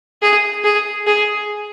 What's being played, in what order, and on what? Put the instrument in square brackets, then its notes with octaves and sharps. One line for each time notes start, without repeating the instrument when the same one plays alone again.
[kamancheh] G#4
G#4
G#4